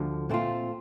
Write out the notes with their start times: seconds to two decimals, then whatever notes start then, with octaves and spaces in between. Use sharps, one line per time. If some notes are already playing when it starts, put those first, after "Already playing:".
Already playing: D2 D3 F3
0.30 A#2 A3 C4 F4